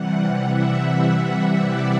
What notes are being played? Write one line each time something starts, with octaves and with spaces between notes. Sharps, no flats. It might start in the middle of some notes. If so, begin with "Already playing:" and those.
Already playing: C3 E3 G3 F#5
E5
D5